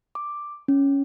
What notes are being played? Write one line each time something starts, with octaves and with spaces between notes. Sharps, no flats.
D6
C#4